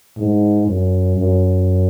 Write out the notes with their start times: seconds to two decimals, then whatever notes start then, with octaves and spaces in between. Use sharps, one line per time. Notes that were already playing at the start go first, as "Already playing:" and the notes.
0.18 G#2
0.67 F#2
1.17 F#2